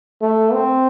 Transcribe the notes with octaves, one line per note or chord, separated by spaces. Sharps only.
A3
C4